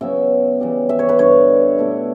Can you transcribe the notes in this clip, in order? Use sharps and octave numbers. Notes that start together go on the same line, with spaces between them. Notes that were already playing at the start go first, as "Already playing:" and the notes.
C#3 F#3 B3 E4 E5
C#3 E3 G3
E5
C#5
B4
G2 D3 G3 C#5
B2 A3 E4